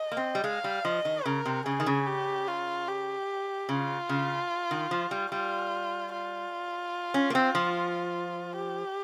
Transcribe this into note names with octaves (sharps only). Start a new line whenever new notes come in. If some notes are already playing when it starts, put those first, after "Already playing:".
Already playing: D#5
A#3
C4
G3
G#3 F5
G3
F3 D#5
D#3
C#3 A#4
C3
C#3 G#4
D#3
C#3
G4
F4
G4
C#3 F4
C#3
D#3
F3
G3
G3 F4
F4
C#4
A#3
C4
F3
G4